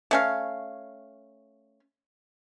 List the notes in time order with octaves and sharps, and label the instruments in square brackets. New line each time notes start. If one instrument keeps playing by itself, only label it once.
[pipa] A3 C#4 F5